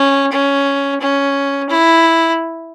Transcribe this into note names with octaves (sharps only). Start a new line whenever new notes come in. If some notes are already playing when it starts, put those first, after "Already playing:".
Already playing: C#4
C#4
C#4
E4